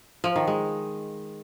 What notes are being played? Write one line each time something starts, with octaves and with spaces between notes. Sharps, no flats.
F3
D#3
G#3